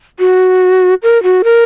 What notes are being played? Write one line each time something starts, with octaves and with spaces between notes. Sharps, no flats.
F#4
A#4
F#4
A#4